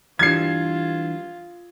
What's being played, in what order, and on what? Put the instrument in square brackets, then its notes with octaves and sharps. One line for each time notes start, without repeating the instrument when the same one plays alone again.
[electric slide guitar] E3 G3 D4 [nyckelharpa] F4 [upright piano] G#6 C7